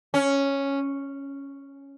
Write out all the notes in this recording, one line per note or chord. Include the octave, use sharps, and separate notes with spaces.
C#4